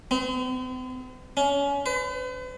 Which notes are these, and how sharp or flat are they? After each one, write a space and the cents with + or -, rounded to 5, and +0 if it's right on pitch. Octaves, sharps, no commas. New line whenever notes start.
C4 -45
C#4 +25
B4 +45